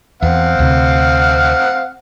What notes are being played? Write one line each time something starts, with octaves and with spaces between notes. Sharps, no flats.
E2 C4 F5 F#5
D2 C3